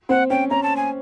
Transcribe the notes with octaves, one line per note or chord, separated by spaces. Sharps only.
C4 F#5
C#4 G5
C#4 A#5
A5
G#5